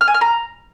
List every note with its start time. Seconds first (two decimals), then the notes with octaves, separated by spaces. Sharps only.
0.01 F6
0.08 G#5
0.14 F6
0.21 A#5